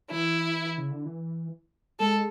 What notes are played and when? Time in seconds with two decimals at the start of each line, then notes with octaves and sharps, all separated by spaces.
0.11 E3 E4
0.78 C#3
0.91 D3
1.05 E3
2.00 G#3 A4